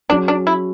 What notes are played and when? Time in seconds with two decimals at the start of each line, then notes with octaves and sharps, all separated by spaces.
0.09 F#3 C#4 D4 G#4
0.28 D4
0.47 E4